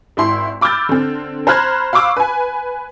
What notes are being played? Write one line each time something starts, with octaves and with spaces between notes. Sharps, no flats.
G#1 E4 C6
B5 D6 E6 F6 G6 A6
D3 C4
C5 A#5 B5 F6 F#6 G#6
F5 B5 C#6 D6 E6
B4 G#5